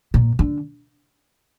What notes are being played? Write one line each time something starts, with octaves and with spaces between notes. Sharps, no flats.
A#2
D3